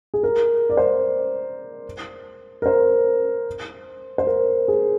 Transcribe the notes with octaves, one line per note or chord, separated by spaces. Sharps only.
G#4
A#4
D5
C5
A#4
C5
C5
A#4
G#4